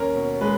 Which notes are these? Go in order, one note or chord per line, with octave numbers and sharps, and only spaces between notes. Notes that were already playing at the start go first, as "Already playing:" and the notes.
Already playing: D#2 C#4 A#4
B2
G#3 B4